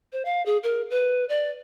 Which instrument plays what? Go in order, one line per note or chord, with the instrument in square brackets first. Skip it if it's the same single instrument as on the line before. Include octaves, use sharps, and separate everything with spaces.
[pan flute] C5
F5
G#4
A#4
B4
D5